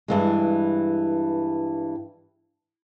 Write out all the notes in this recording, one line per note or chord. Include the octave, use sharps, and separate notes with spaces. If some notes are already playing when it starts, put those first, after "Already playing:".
G2 E3 G#3